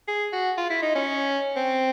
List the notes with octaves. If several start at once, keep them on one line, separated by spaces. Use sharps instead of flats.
G#4
F#4
F4
E4
D#4
C#4
C4